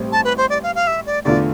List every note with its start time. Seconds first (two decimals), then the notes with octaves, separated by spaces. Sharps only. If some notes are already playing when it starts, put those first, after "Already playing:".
Already playing: A1 A2 G3 C4
0.12 A5
0.25 B4
0.37 C5
0.50 D5
0.63 F5
0.75 F5
0.87 E5
1.06 D5
1.24 E2 D3 A3 D4 F4 D5